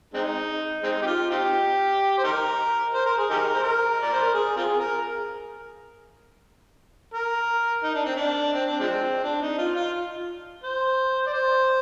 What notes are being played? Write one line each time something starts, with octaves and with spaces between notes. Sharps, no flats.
G#3 C4 D#4
G#3 C4 D#4
G4
F4
C4 D#4 G4
C5
D#4 G4 A#4
C5
A#4
G#4
D#4 G4 A#4
C5
A#4
D5
C5
A#4
G#4
C4 F4 G#4
A#4
A#4
D#4
D4
C4
D4
C4
D4
F3 G#3 C4
D4
D#4
F4
F4
C5
D5
C5